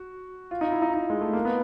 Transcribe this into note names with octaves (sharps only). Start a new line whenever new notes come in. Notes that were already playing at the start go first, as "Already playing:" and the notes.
Already playing: F#4
F4
D#4
E4
D#4
D#4
G#3
A3
A#3
B3